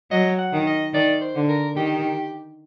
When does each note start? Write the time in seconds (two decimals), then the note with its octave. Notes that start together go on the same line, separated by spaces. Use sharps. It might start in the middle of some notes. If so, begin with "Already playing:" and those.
0.11 F#3 D#5
0.39 F#5
0.53 D#3
0.67 D#5
0.93 D#3 D5
1.21 C5
1.35 D3
1.49 A#4
1.77 D#3 G4